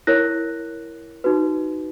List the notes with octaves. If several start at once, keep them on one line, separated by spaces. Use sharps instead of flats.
E4 A#4 C#5 F#6 A#6
D#4 F#4 B4